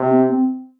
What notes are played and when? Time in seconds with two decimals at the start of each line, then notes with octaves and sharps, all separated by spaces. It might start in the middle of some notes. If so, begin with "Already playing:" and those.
Already playing: C3
0.11 C4
0.29 C4